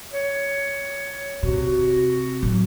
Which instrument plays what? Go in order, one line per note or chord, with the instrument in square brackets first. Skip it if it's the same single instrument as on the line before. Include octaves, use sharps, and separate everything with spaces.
[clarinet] C#5
[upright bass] C3 [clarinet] F#4
[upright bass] A1 F#2